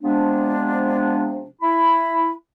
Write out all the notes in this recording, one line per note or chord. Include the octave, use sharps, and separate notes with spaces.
C3 F3 G#3 B3 D4
E4 B5